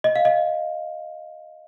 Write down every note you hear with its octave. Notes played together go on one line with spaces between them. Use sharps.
D#5
F5
D#5